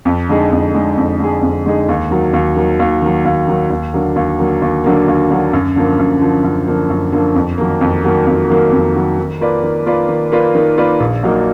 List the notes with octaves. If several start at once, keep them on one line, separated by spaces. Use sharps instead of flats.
F2
D3 G#3 D#4 G#4
F2
D3 G#3 D#4 G#4
F2
D3 G#3 D#4 G#4
F2
D3 G#3 D#4 G#4
D#2
D#3 F#3
D#2
D#3 F#3
D#2
D#3 F#3
D#2
D#3 F#3
D#2
D3 F#3 A#3
D#2
D3 F#3 A#3
D#2
D3 F#3 A#3
D#2
D3 F#3 A#3
F#2
D3 F3 A#3
F#2
D3 F3 A#3
F#2
D3 F3 A#3
F#2
D3 F3 A#3
F2
D#3 F#3 A#3
F2
D#3 F#3 A#3
F2
D#3 F#3 A#3
F2
D#3 F#3 A#3
D#3
A#3 F4 B4 D5
D#3
A#3 F4 B4 D5
D#3
A#3 F4 B4 D5
D#3
A#3 F4 B4 D5
A#1
A#2 F#3 A#3 D#4